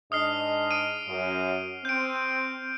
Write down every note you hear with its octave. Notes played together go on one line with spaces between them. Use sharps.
G#2 D4 D#5 D#6 F6 C7
D#6 D7 D#7
F#2
C4 G6 D7